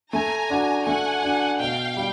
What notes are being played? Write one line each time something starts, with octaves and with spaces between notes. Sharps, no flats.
A3 G#5 A#5
D4 F#4
A3 F#5 G#5
D4 F#4
B2 F5 G5
G3